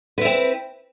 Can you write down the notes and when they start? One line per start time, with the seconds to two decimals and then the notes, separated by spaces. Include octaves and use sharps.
0.18 B4
0.21 E4
0.25 C4